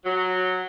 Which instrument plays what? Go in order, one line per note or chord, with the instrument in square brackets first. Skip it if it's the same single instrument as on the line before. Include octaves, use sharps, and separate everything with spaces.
[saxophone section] F#3